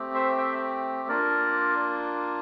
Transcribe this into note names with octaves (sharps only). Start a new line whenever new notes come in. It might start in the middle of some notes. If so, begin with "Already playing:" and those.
Already playing: A3 C4 G4
C5 E5
E5 G5
A#3 D4 F4 A#4 D5